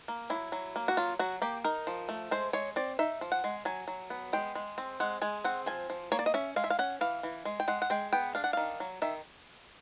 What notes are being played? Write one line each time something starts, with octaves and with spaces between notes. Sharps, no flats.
A#3
F#3 E4
F#3
A#3
F#4
F#3 F4
F#3 F#4
A#3 G4
D#4 A#4
F3
A3
G#3 C5
G#3 C#5
C4 D5
D#4 E5
F3
F#5
G#3
F#3 G#5
F#3
B3
G#3 G5
G#3
C4
G#3 F#5
G#3 G#5
C4 F#5
F3 G#5
F3
A#3 C#5
D5
D#5
C#4 E5
G#3 F5
E5
F5
C#4 F#5
E3 F5
E3
G#3
G5
G#3 F#5
F#5
G#3 G5
B3 G5
D4 F5
F#5
D#3 F5
F#3
D#3 E5